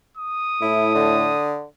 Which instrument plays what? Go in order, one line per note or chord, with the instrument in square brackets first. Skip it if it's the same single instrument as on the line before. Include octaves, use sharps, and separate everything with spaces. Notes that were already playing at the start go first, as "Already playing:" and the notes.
[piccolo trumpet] D#6
[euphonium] A2 [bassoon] E4
[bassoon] D3